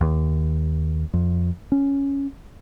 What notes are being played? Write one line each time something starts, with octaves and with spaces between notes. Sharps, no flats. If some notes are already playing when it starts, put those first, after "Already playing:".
D#2
F2
C#4